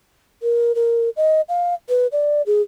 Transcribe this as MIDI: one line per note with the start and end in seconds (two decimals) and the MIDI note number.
0.42 0.75 70
0.75 1.09 70
1.17 1.41 75
1.49 1.74 77
1.89 2.07 71
2.12 2.42 74
2.46 2.62 68